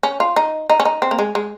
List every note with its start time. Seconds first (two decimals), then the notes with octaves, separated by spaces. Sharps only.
0.03 C#4
0.20 F4
0.36 D#4
0.70 D#4
0.80 C#4
0.85 D#4
1.02 C4
1.11 A#3
1.19 G#3
1.35 G#3